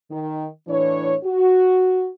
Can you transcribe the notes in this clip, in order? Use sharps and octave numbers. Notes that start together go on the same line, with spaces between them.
D#3
A2 E3 D4 C#5
F#4